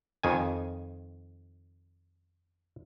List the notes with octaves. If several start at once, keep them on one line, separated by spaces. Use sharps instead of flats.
F2 D#3 G#5